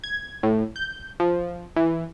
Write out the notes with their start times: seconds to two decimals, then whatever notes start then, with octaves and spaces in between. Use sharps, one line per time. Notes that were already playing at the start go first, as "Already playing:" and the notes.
0.04 G#6
0.43 A2
0.76 G6
1.20 F3
1.76 E3